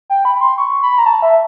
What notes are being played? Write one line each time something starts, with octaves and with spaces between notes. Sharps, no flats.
G5
B5
C6
C#6
B5
A#5
A5
E5